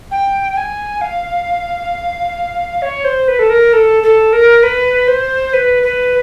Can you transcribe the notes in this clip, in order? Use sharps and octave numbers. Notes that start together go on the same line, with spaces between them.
G5
G5
G#5
F5
C#5
C5
B4
A4
A#4
A4
A4
A#4
B4
C5
B4
B4